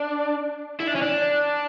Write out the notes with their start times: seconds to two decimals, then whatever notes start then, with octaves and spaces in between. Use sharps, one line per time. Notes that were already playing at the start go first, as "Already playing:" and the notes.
Already playing: D4
0.80 E4
0.87 D4
0.95 C#4
1.02 D4